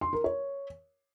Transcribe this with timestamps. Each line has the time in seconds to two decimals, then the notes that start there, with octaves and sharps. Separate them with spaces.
0.01 C6
0.13 A#4
0.24 C#5